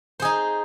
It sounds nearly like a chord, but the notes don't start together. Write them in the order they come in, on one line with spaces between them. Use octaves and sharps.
C5 G#4 D#4